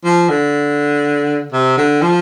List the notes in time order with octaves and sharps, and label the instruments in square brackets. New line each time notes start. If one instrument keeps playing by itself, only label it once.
[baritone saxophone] F3
D3
C3
D3
F3